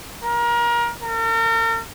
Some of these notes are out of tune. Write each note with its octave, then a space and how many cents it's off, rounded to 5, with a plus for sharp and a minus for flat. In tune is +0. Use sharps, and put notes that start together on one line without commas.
A#4 +30
A#4 -40